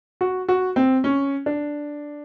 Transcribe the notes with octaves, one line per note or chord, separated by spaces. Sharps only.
F#4
F#4
C4
C#4
D4